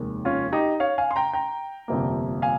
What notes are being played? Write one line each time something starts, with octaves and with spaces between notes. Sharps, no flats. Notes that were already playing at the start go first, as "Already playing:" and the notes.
Already playing: F1 D#2 D#3 G#3
C#4 F4
D#4 G4
C#5 F5
F5 G#5
C6
G5 A#5
G5 A#5
G1 F2 C3 G3 A#3
F5 G#5